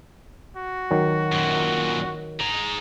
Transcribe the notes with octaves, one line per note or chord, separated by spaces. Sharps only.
F#4
D#3 F#3
F#2 A#2
G#4 A#5